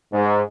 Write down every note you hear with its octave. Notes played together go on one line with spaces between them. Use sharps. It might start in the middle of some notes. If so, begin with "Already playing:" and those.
G#2